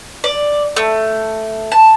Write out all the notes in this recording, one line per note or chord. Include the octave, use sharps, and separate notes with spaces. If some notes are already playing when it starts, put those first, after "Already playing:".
D5
A3
A5